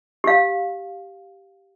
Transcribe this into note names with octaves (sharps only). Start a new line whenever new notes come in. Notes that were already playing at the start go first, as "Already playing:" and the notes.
G4 F5